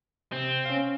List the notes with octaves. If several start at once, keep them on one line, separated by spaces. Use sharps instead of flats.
C3 C4
C#4 F5